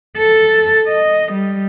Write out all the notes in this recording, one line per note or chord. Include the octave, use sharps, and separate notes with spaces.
A4
D#5
G3